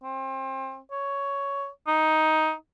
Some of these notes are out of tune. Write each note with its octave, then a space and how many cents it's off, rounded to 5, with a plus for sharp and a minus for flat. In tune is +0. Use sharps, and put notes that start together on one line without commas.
C4 +30
C#5 +10
D#4 +10